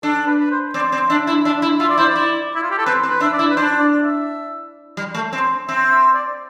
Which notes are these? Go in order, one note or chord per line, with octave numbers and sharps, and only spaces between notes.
D4 A4
B4
B4
C5
C4 D5
C4
D4 E5
E4
D4 E5
E4
F4 E5
D5
E4 C5
D5
E4
E4
F4
G4
A4
C4 B4
C4
B4
D4 E5
D5
E4
B4
D4 C5
D5
E5
G3
A3
C4
C4 E5
E5
D5